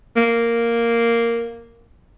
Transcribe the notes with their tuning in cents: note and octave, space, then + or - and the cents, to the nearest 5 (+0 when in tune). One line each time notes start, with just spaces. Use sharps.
A#3 -5